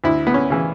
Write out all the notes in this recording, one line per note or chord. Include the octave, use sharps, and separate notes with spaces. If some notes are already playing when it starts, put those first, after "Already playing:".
D2 E4
B3
C#4
C#3 E3